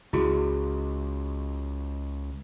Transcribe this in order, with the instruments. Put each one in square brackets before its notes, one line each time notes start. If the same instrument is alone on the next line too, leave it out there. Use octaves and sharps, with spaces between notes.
[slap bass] C#2 [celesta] E4 F#4 G#4